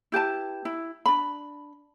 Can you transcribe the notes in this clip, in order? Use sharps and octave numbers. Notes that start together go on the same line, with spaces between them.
E4 G4 B4 A5
E4
D4 B5